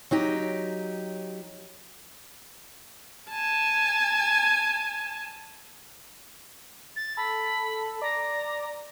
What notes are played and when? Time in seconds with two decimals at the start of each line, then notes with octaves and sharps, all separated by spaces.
0.11 F#3 D#4 G4
3.31 G#5 A5
6.96 A6
7.17 A4 B5
8.02 D5 A#5